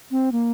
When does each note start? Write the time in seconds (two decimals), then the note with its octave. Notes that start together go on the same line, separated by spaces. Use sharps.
0.11 C4
0.32 A#3